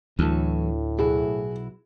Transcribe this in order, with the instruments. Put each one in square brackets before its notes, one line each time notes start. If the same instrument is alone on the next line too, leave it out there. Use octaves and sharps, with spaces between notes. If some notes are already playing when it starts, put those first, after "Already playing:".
[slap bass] D2 [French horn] A2 [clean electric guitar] E3 F#3 A4
[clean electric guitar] B1 E4 F#4 [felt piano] G#4